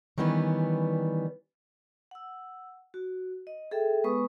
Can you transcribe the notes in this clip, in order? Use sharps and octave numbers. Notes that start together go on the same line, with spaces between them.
D#3 E3 G3 B3 C#4 B4
F#5 E6
F#4
D#5
G#4 A4 E5 G5
G#3 B3 B4 C#6 D#6